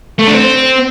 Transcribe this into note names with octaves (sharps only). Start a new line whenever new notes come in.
A3
D4
C4